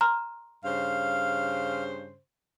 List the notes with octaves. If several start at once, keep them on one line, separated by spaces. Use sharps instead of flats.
A#5 C6 F6
G2 C#3 C5 F5